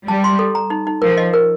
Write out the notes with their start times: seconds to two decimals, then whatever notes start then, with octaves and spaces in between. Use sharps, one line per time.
0.08 G3 A5
0.24 C6
0.39 A4
0.55 A#5
0.70 D#4
0.87 D#4
1.02 F3 A#4
1.17 D#5
1.34 A#4